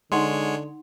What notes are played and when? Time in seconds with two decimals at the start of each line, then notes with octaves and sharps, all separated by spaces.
0.12 D3 G#3 D#4 C#5 F#5 C6